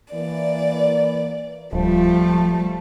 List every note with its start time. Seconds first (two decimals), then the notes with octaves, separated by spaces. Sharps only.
0.14 E3 A#3 D5
1.73 D1 F3 G3 A3